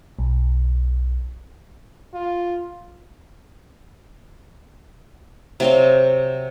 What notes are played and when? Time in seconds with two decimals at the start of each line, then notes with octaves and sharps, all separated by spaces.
0.19 B1
2.14 F4
5.60 C3 F#3 C4 F5